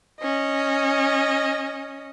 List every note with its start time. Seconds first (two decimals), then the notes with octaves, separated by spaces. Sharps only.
0.19 C#4 D#5